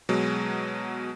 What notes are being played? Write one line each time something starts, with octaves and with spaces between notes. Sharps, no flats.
B2 F#3 G#3